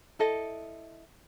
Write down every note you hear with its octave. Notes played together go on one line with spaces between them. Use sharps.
E4 A4 D#5